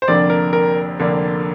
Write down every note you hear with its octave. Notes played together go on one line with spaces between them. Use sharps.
C5
F1 F2 D3 A#3 D4 D5
A#4
A#4
F1 F2 D3 A#3 D4